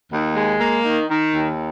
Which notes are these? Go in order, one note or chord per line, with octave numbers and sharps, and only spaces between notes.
D#2
G#3
A#3
D#3
D#3
D#2